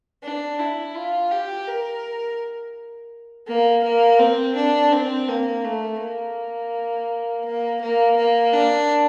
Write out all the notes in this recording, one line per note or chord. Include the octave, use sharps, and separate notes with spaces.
D4
E4
F4
G4
A#4
A#3
A#3
C4
D4
C4
A#3
A3
A#3
A#3
A#3
A#3
D4